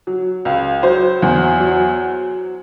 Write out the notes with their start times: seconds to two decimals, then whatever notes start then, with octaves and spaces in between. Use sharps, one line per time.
0.07 F#3
0.45 C#2
0.83 F#3 C5
1.22 E2
1.60 F#3